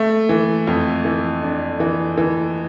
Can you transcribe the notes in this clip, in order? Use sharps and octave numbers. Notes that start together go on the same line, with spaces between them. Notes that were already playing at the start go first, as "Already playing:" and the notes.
Already playing: A3
E3
F2
E3
D4
E3
E3